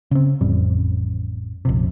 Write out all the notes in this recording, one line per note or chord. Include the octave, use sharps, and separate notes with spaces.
C#3 C4
A1 F2 G3
A#1 F2 C3